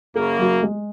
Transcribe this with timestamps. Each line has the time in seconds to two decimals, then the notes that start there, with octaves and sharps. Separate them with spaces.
0.15 F#2 C#3 A#3 G#4
0.39 F#3
0.63 G#3